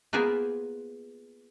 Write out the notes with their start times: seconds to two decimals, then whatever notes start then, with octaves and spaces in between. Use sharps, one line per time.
0.13 A#3 B3 F4 G#4 A#4 C5